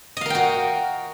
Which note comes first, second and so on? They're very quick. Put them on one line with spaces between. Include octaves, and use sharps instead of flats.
D#5 F5 A#4 G5 F#4